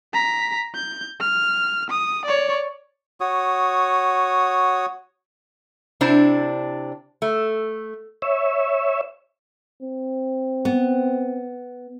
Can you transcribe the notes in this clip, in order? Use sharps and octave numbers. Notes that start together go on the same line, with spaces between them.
A#5 B6
G6
F6
D#6
C#5 D5
F#4 C#5 D#6
C3 D4 E4 C5 D5
A3
C#5 E5
C4
B3